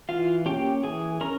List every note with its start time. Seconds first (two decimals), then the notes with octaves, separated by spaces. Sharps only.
0.09 E3 F4 F5
0.46 A#3 C#4 G4 G5
0.83 E3 G#4 G#5
1.21 C#4 A#4 A#5